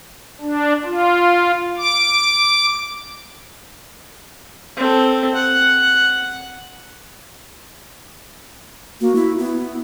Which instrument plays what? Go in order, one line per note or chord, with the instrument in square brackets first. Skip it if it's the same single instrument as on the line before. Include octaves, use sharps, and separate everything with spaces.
[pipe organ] D4
F4
D6
[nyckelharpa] C4 A4
F#5
[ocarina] A#3 [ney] F#4
[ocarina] E4
[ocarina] B3 [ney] E4